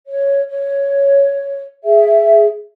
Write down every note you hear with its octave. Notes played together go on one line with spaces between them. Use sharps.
C#5
C#5
G#4 E5